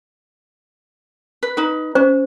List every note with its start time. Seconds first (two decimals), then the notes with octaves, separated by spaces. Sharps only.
1.43 B4
1.57 D#4 B4
1.95 C#4 C5